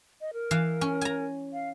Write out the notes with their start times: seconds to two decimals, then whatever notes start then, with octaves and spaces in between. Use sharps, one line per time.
0.21 D#5
0.33 A#4
0.51 E3 F5
0.81 C#4
1.01 G#5 A#5
1.53 F5